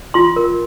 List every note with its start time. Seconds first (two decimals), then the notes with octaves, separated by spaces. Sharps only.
0.14 F4 C6
0.36 A#4